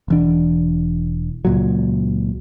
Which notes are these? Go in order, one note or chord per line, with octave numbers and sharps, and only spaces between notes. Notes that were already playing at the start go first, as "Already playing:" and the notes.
E1 E3 D4
C#2 A#2 F#3